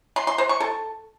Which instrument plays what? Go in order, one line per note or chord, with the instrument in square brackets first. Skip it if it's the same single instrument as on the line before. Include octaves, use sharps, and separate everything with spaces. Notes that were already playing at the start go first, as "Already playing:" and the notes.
[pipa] C6
C6
C5
C#6
A4